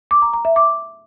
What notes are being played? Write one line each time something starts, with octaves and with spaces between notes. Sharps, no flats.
D6
A#5
A#5
E5
D6